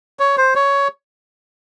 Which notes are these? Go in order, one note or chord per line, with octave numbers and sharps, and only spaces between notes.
C#5
C5
C#5